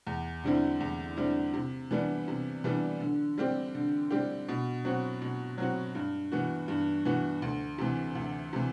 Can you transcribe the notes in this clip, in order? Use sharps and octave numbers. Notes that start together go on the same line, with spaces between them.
E2
D3 G3 C4 E4
E2
D3 G3 C4 E4
C3
E3 G3 B3 D4
C3
E3 G3 B3 D4
D3
G3 C4 G4
D3
G3 C4 G4
B2
F#3 C4 F#4
B2
F#3 C4 F#4
G2
E3 B3 F#4
G2
E3 B3 F#4
D2
C3 E3
D2
C3 E3